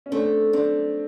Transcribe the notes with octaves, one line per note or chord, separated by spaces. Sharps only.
C#4
A3 C4 D4
A3 C4 D4